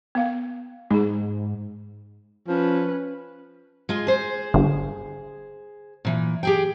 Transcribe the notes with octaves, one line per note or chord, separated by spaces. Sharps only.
B3 F5
G#2 D#4 G#4
F3 C#4 B4
G#3 F4
G#4 C5
G1
A#2 E3
G4 G#4 G5